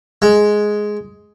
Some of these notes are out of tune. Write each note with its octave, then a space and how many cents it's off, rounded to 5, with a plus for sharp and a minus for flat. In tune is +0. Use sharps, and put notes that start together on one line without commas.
G#3 +10